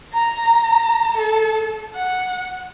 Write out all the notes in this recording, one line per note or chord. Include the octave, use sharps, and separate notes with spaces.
A#5
A4
F#5